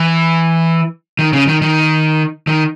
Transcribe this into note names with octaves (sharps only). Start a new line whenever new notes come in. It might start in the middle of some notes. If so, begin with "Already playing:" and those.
Already playing: E3
D#3
C#3
D#3
D#3
D#3